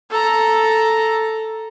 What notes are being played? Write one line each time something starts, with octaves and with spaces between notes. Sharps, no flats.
A4 A#5